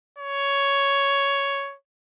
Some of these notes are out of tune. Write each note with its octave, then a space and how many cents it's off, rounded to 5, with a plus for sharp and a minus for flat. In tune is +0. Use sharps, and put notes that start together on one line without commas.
C#5 +5